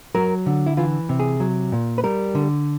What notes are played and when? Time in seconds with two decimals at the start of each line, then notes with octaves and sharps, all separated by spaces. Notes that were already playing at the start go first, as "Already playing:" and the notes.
0.15 F#3 A#4
0.46 D3
0.66 E4
0.77 E3 F4
1.09 C3
1.20 G#4
1.40 F#3
1.72 A#2
1.98 B4
2.04 G3 A#4
2.35 D3